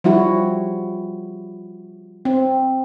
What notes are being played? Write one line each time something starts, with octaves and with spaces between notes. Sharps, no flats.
F3 G3 E4 F#4
C4